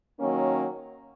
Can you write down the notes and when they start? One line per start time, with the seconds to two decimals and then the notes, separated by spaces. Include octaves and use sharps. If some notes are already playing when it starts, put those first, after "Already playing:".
0.19 D#3 F#3 A#3 C#4